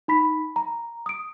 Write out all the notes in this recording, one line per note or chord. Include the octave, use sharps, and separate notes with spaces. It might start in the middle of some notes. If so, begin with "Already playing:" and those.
D#4 B5 B6
A#5
D#6 D7